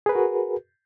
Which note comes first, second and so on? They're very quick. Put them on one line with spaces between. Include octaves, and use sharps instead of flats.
G#4 B4 A#4 F#4